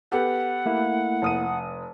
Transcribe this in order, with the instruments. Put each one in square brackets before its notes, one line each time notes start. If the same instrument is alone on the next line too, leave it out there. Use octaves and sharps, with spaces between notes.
[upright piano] B3 G4 A4 [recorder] F#5
[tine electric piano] A3 A#3 E4
[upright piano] F1 D#6 D#7